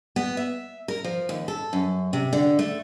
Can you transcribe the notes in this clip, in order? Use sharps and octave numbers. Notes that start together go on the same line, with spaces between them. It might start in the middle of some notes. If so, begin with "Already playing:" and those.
B3
E5
A#4
F3
D#2
A4
F#2
C3
D3
A3